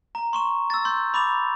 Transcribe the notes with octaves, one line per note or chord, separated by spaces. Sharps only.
A#5
C6 C#6 E7
E6 A6
C6 G6
B5 D6 A6 F7